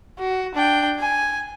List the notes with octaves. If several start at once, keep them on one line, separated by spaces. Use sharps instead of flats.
F#4
D4 G5
G#5